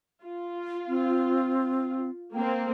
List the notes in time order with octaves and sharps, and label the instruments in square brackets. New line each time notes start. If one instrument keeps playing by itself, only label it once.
[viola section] F4
[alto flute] C4
[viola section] A#3 C4 [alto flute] G5